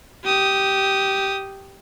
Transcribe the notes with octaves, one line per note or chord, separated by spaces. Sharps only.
G4 D#6